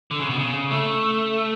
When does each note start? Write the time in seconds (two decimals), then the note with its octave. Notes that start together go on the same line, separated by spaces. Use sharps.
0.11 D3
0.20 C#3
0.30 B2
0.39 C#3
0.71 A3